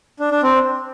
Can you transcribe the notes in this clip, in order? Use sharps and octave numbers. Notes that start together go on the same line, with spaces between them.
D4
D4
C4